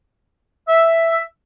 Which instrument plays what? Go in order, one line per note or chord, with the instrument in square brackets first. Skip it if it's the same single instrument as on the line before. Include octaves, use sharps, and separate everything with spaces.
[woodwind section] E5